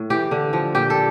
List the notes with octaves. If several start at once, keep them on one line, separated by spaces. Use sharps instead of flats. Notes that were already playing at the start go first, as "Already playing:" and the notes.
Already playing: A2
E3 G4
D3
F3
A#2 G4
A4